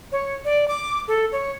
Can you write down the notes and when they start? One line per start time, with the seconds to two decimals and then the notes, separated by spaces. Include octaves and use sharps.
0.12 C#5
0.45 D5
0.68 D6
1.08 A4
1.32 C#5